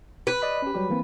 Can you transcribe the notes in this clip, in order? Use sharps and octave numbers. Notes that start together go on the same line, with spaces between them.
B4
D5 D#5 B5
C#4 G4
F#3 G3 G4
E3 A#3 C4